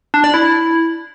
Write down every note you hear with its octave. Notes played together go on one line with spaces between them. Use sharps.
D4
D5
E4